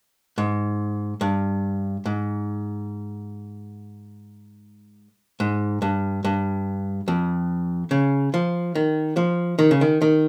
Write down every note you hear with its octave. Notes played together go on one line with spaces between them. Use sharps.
G#2
G2
G#2
G#2
G2
G2
F2
C#3
F3
D#3
F3
D#3
C#3
D#3
D#3